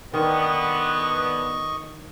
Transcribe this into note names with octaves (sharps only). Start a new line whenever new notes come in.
D3 D#3 B3 D#5 C#6